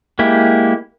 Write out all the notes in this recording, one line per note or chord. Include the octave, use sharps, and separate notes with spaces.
G#3 A#3 E4 G4